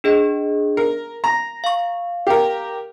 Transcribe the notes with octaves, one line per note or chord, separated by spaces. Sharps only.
D4 G#4 D#5
A#4
A#5 A#6
F5 C#6
G4 A#4